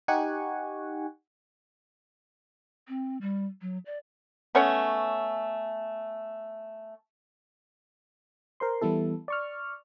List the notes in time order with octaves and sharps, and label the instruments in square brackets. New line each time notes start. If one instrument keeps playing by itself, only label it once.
[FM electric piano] D#4 G4 F#5 G#5 C#6
[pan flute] C4
G3
F#3
D5
[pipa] A3 B3 C#4 C#5
[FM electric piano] A#4 C5 C6
E3 G3 B3 E4 A4
D5 C#6 F6